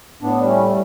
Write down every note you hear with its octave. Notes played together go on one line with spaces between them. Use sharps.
A2 B3 D4
G3 D4
A3 C#4
A2